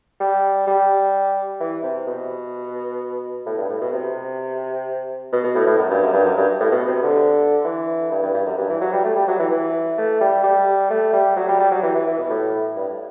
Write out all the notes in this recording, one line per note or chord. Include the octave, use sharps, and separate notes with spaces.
G3
G3
E3
C3
B2
A2
G2
A2
B2
C3
B2
B2
A2
A2
F#2
G2
F#2
G2
F#2
G2
A2
B2
C3
D3
E3
G2
G2
G2
F#2
G2
E3
F#3
G3
A3
G3
F#3
E3
E3
A3
G3
G3
A3
G3
F#3
G3
G3
F#3
E3
E3
E3
B2
A2
G2